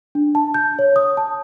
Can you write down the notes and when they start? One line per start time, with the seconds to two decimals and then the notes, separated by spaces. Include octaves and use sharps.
0.15 D4
0.35 A5
0.54 G6
0.79 C#5
0.96 D#6
1.17 A5